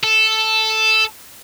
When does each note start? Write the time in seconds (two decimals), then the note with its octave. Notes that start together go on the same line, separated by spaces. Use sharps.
0.04 A4